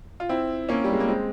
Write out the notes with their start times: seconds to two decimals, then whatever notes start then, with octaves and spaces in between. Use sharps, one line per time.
0.20 F4
0.29 C4 E4
0.69 A#3 C#4
0.84 G3
0.93 G#3
1.00 A#3
1.08 G#3 C4